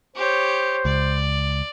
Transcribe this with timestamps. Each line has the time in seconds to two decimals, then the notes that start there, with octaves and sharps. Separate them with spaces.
0.16 G4 C5 C#5
0.85 C#2 D5